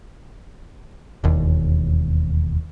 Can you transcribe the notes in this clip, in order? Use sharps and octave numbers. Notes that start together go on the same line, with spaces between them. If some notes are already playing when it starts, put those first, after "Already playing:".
E1 D#2